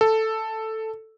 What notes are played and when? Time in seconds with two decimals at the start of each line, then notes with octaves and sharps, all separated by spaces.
0.01 A4